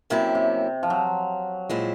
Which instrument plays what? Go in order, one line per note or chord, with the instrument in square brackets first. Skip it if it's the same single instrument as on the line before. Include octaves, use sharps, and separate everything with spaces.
[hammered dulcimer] C3 [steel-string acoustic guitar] F#3 A#3 C#4 E4
[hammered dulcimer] C3
F3
F#3
[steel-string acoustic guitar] A#2 F3 G#3 C4 E4